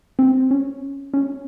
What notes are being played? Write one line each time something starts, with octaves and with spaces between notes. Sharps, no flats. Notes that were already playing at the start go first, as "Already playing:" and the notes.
C4
C#4
C#4